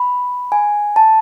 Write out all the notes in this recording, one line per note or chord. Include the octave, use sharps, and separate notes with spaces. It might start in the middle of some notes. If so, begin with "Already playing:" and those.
Already playing: B5
G#5
A5